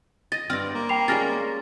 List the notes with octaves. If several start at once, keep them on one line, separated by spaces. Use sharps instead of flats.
D#5 A6 A#6
G2 C4 D5 F6 A#6
A#3
G5 B5 C7 F7
G3 G#3 C#4 F6 A6 A#6 C7